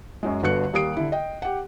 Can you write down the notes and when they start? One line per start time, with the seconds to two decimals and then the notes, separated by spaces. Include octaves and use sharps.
0.23 F#2 F#3 G#3
0.43 G1 D3 B3 F#4 F#6 C#7
0.73 D#2 G3 A#3 D#6 C7 D7
0.97 D3 E4
1.12 D#5 G5
1.42 G4 F#5